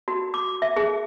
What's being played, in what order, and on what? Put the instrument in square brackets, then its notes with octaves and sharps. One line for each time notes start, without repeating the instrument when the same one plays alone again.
[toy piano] F#4
D6
E5
G#4